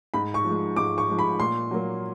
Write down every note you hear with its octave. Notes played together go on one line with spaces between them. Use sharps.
G#2 B5
C#6
F3 G#3
G#2 D6
C#6
F3 G#3
B5
A#2 C6
F#3 A#3